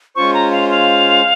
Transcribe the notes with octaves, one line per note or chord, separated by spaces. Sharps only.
G#3 C#4 F4 C5 C#6
A#5
F5
F5